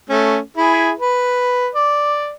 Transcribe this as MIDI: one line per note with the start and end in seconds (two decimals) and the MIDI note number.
0.10 0.38 57
0.10 0.38 61
0.57 0.91 64
0.57 0.91 68
0.97 1.68 71
1.75 2.32 74